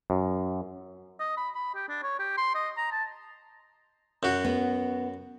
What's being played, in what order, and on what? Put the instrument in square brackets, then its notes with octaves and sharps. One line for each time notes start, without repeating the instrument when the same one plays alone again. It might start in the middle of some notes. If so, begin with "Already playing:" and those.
[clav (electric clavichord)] F#2
[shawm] D#5
B5
B5
G4
D4
C#5
G4
C6
D#5
A#5
A5
[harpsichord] F#2 F#4
[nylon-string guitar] B3